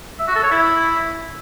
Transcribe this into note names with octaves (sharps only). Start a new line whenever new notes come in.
E5
F#4
A4
C#5
E4